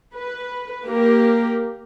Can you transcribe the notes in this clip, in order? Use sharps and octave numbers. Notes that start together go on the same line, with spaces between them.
B4
A#3 G4 A#4